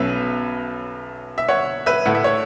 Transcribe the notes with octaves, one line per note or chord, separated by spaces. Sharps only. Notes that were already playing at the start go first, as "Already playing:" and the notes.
Already playing: B1 B2 F#3 C#4 B4 E5
E5
C#5 F#5
B4 E5
A2 A3 E4 F#5
E5
C#5